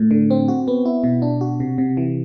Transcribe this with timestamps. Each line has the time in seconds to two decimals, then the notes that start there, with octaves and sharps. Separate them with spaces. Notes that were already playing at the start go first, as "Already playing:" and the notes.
Already playing: A2
0.11 D3
0.31 C4
0.48 F#4
0.68 B3
0.86 E4
1.04 B2
1.22 D4
1.41 F#4
1.60 C3
1.78 C3
1.97 E3